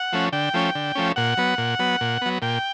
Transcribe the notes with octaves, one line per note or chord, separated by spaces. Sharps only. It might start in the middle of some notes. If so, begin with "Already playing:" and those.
Already playing: F#5
F3 A3 C#4
D3 G5
F3 A3 C#4
D3
F3 A3 C#4
A#2 F#5
F#3 B3
A#2
F#3 B3
A#2
F#3 B3
A#2 G5